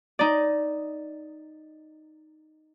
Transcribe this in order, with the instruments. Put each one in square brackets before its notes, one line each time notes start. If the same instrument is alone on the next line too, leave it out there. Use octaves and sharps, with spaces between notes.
[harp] D#4 D5